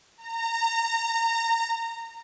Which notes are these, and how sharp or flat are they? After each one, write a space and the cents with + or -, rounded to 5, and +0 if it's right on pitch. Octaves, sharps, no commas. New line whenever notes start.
A#5 -25